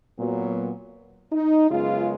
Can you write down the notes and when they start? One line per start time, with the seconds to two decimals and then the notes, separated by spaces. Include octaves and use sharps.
0.18 A#2 F#3 B3
1.32 D#4
1.70 F#2 C#3 G#3 B3 F4